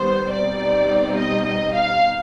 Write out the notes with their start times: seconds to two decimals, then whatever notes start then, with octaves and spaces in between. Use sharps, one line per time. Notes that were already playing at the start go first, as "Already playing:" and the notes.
Already playing: D#3 G3 B3 C5
0.30 B2 G3 C4 D#4 D5
1.16 D#5
1.45 D#5
1.74 F5